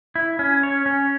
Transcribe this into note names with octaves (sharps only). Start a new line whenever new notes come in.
E4
C#4
C#5
C#4